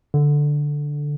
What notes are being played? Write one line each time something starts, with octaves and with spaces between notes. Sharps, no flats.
D3